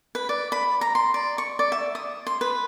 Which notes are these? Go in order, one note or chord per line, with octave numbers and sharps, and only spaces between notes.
B4
D5
B5
A#5
C6
D5
C#6
D5
E5
D#6
C6
B4